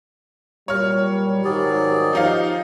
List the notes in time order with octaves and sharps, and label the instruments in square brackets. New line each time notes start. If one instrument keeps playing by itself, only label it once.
[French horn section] A#2 F#3 G3 [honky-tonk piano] C#5 F6
[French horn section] G#2 D#3 G4 [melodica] F#3 G#4 D5
[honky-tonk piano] F3 D#4 F5